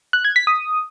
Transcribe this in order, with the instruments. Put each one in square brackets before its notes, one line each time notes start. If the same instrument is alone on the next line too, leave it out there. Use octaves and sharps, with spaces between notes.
[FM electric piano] F#6
G#6
B6
D#6